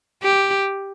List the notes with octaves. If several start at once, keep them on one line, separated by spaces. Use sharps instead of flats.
G4